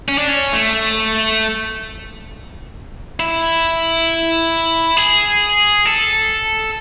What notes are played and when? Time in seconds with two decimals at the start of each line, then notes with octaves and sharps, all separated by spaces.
0.09 C#4
0.18 D4
0.29 C#4
0.53 A3
3.20 E4
4.97 G#4
5.85 A4